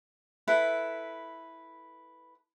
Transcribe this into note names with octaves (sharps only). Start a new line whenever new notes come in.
E4 A4 B4